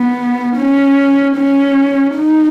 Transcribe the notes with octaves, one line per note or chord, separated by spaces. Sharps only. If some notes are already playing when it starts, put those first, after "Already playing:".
Already playing: B3
C#4
C#4
D#4